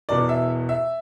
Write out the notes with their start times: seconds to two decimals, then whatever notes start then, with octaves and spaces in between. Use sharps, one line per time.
0.09 E1 E2 B2 D5
0.29 E5
0.69 E5